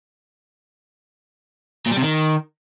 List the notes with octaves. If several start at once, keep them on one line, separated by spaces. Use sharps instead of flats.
A#2
G3
C3
D#3